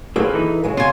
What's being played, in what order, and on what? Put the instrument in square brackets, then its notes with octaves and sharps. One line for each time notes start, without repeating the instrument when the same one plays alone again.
[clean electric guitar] F#3 A#3 C4 [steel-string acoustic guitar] G#4 A4 B4
[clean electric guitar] E3 D#4
[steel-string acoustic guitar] C#3 F#3 G#3
[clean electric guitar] B2 [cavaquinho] F4 G#5